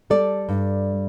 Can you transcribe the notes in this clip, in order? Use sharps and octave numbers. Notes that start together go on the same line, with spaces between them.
G3 A4 D5
G2